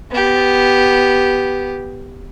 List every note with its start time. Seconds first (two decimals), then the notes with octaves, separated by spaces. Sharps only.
0.11 B3 G4